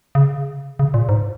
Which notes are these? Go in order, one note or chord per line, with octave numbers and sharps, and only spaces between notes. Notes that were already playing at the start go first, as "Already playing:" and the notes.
C#3
C#3
A#2
G#2